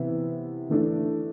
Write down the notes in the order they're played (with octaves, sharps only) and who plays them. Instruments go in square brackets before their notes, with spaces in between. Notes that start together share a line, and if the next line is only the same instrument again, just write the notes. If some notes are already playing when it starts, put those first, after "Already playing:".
Already playing: [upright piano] C3 E3 B3 E4
E3 A3 D4